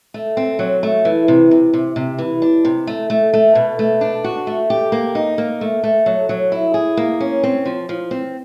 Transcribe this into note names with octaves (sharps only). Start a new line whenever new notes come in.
A3
C4
F#3
A3
E3
C3
C3
C3
C3
E3
D4
C3
A3
A3
A3
B2
A3
D4
F#4
A3
G4
A#3
D#4
A#3
A3
A3
F#3
F#3
E4
G#4
A#3
C#4
C4
F3
F3
C4